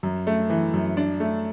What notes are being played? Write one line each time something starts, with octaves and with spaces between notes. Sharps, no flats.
F#2
A3
E3
F#2
D4
A3